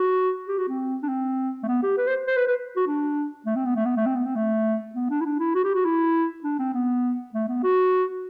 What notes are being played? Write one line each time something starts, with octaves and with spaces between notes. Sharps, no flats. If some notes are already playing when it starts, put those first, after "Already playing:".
Already playing: F#4
G4
F#4
C4
D4
C4
A3
B3
G4
B4
C5
C5
B4
B4
F#4
D4
A3
C4
B3
A3
B3
A3
C4
B3
C4
A3
B3
D4
E4
D4
E4
F#4
G4
F#4
E4
D4
C4
B3
A3
B3
F#4